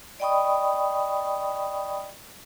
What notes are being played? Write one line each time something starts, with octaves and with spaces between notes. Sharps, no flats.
D5 D#5 G5 B5 C#6 D#6